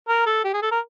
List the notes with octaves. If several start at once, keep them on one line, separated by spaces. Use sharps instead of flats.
A#4
A4
G4
G#4
A4
A#4